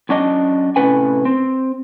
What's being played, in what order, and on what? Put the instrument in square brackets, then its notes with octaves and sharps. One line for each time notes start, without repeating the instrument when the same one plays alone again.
[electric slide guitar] F#2 C#4 D4 D#5
A2 C3 C#4 B4 G#5
C4